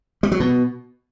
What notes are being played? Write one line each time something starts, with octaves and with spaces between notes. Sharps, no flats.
G3
F#3
B2